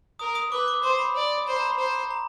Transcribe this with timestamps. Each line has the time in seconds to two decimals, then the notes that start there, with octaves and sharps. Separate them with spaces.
0.19 A#4 D#6
0.35 D#6
0.51 B4 D6
0.68 D6
0.83 C5 C6
0.99 B5
1.16 D5
1.47 C5 B5
1.56 A#5
1.66 B5
1.79 C5 A#5
2.11 A#5